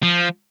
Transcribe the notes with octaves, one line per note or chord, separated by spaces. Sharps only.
F3